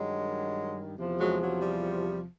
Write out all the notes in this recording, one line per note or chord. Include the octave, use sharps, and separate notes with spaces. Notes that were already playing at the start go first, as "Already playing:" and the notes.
Already playing: G2 D#3 F#3 G#3
E2 C3 F3
F#3 G#3
F#3
G3